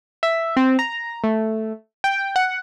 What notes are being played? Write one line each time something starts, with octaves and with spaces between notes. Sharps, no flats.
E5
C4
A#5
A3
G5
F#5